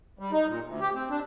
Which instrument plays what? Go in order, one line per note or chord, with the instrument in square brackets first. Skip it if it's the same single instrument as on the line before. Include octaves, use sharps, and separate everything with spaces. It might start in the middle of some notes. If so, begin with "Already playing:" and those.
[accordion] G3
D#4
A#2
D2
G4
C4
D4